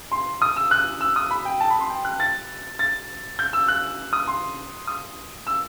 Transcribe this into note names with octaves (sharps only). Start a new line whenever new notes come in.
C6
D#6
E6
F#6
E6
D#6
B5
G5
A5
B5
C6
G5
F#6
A6
A6
G6
E6
F#6
D#6
C6
D#6
E6